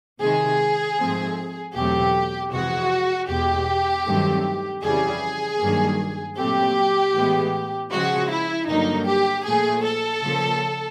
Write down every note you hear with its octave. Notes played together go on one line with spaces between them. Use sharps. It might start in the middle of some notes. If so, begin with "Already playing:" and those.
C3 D#3 G#3 G#4
G#2 F3 A3 C4
E2 B2 F#3 A3 C4 G4
F2 C3 E3 G#3 F#4
E2 B2 G#3 G4
G2 D#3 F#3 A3 C4
F2 C#3 E3 G3 G#4
G2 D#3 F#3 A#3
A#2 F#3 A3 C4 G4
A2 E3 G#3 B3
C#3 F3 G#3 F#4
E4
G2 D3 F#3 A#3 D#4
G4
A#2 F3 A3 G#4
A4
C#3 F3 A#3